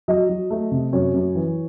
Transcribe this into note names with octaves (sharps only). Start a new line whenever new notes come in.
F#3 D#5
F#3
A3
C3
F#2 C#5
F#2
E3